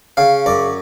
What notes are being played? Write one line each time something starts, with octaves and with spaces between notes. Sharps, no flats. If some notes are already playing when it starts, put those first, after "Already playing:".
C#3 F5
F#2 D5